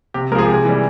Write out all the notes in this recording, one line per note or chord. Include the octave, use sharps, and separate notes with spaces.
C3 G4
F3 G#3 G#4 A#4
C3 G4
G#4
E3 G3